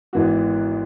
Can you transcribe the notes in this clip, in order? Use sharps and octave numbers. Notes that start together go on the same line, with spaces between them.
G#1 G#2 E3 B3 F#4